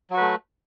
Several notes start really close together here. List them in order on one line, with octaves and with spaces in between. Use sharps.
F#3 F#4 B4 A3